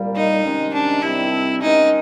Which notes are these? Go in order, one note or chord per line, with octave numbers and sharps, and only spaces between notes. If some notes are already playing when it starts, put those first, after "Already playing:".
Already playing: C2 A#2 G3 A#3
D#4
C3 D#3 G#3 C#4
D4
C3 D#3 G3 C4 E4
D#3 G#3 C#4 D#4